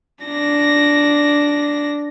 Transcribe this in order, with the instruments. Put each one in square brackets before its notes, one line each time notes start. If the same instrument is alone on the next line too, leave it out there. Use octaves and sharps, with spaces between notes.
[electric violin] D4 A#6